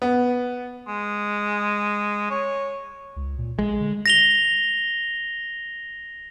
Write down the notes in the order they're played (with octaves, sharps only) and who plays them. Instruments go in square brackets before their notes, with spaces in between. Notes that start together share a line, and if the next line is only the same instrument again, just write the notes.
[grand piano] B3
[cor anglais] G#3
C#5
[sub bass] C#2
A#2
[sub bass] A#1 [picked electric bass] G#3
[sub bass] D3
[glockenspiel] A#6 F7 G7